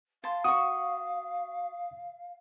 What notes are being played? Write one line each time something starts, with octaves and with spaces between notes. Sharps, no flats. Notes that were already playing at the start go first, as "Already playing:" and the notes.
F5 A5 C6
F#4 C#6 D#6